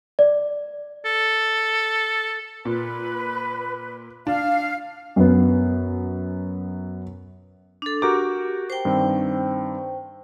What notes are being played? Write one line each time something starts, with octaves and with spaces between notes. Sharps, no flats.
D5
A4
A#2 B4
D4 F5
F#2 B3
D4 A4
F#4 G4 A#4 D6
C5 G5
G2 D#3 C4